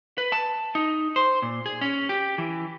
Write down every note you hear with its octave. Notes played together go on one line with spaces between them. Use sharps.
B4
A5
D#4
C5
A#2
G#4
C#4
G4
E3